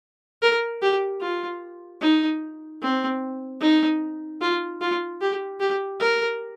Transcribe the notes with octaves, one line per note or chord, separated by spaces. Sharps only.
A#4
G4
F4
D#4
C4
D#4
F4
F4
G4
G4
A#4